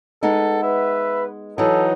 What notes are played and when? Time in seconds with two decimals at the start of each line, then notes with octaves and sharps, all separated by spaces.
0.23 G#3 B3 D#4 A4
0.63 B4 E5
1.58 E3 F#3 D#4 A4